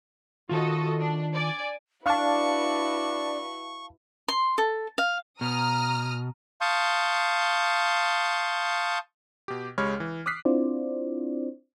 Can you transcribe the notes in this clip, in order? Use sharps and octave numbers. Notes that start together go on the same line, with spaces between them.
D#3 F4 F#4 A4 D#5
D4
D5 G#5
D4 E4 F#4 B4 F5 A5 C#6
C6
A4
F5
B2 A#5 D#6 F6
F5 A5 C6 C#6 D#6 G6
B2 G4
C#2 G#3 G4 C#5 B5 F6
E3
D6 D#6 F6 F#6 B6 C7
C4 D4 E4 F4 C5 D5